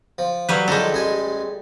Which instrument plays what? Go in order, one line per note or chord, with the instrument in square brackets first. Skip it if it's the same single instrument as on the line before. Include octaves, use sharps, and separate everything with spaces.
[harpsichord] F3
[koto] F#3 G3 B4
[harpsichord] D#3 F3 G#3 [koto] G3 A4
[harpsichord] A1 G#3 G#5